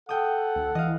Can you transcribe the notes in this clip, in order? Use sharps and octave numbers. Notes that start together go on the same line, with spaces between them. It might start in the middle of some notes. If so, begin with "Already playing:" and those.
A4 F#5 G5 D#6
D2
E3 D#5 F5